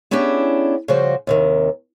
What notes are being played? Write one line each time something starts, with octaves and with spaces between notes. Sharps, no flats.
B3 C#4 D4 E4 G4 G#4
C#3 F3 G3 F#4 C5
D#2 C3 D#3